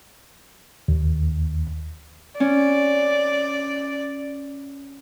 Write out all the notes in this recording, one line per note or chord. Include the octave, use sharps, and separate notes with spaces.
D#2
C#4 D5